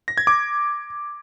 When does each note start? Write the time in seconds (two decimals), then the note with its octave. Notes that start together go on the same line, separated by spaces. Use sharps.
0.08 A#6
0.18 G#6
0.27 D6